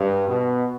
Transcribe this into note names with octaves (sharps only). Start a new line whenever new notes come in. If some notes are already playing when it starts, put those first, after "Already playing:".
Already playing: G2
B2